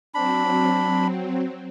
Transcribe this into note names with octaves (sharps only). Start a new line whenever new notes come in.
F#3 C4 D4 B5